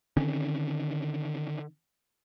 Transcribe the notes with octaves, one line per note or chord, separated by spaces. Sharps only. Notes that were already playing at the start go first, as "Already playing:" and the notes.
D3 D#3 C4 C#4